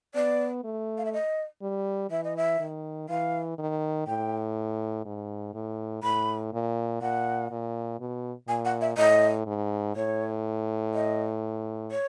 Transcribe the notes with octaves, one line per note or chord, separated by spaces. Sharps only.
B3 D5
A3
F5
E5
D#5
G3
E3 E5
D#5
E5
D#3
E3 F5
D#3
A2 G5
G#2
A2
A2 B5
A#2
A#2 F#5
A#2
B2
A#2 G#5
F#5
E5
A2 D#5
G#2
A2 C#5
D#5
C#5